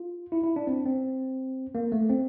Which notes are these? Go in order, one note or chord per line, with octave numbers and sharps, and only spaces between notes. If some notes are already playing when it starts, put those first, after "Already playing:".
Already playing: F4
E4
E4
D4
C4
C4
A#3
A3
C4